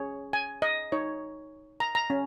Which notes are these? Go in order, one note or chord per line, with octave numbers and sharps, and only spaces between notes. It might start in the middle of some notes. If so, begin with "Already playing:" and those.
Already playing: C#4 G#4 C#5
G#5
D#5
D#4 C#5
A#5
A#5
C#4